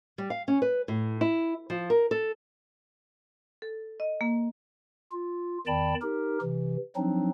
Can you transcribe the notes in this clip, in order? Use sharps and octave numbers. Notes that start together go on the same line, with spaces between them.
G3
F5
C#4
B4
A2
E4
F3
A#4
A4
A4
D#5
A#3
F4
E2 D#3 D5 G5 A5 B5
D#4 G4 A#4
C3 E3
F3 F#3 C4 D4 D#4